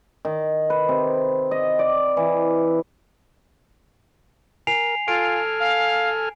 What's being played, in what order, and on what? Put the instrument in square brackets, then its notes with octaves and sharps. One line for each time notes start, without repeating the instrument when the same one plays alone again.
[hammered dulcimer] D#3
B4
C3
D#5
D5
E3
[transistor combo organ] A#4 [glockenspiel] G#5 C7 F7
[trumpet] F4 [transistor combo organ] A4 G#5 F6 [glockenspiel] D7
[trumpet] F5